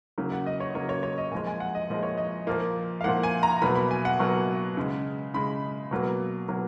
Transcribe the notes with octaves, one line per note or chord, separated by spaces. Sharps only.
C#3 F#3 A#3
F#5
D#5
C#5
C#3 F#3 A#3 C#5
C#5
C#5
D#5
A#2 F3 G#3 G#5
G#5
F#5
D#5
A#2 F3 G#3 D#5
C#5
D#5
A#2 F3 A#3
F5
A#2 F3 A#3 F#5
G#5
A#5
B2 F#3 A#3 B5
B5
G#5
F#5
B2 F#3 A#3 C#6
C#3 G#3
C#3 G#3 B5
B2 F#3 A#3
B2 F#3 A#3